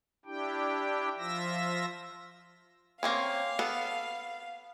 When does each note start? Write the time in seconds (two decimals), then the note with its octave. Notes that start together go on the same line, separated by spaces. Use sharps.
0.25 D4 E4 G4 G5
1.18 F3 F4 E5 E6 A#6
3.03 A#3 C4 C#4 F5
3.59 B3 A4